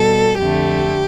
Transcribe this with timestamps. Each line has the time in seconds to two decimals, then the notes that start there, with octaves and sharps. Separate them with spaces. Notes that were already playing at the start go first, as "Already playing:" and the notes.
Already playing: B2 G3 A4
0.38 F2 D3 A3 G4